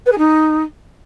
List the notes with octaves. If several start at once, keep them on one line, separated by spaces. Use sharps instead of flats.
B4
G#4
D#4